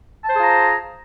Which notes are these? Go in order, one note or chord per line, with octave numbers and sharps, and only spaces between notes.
F4 G#4 C5 A5 A#5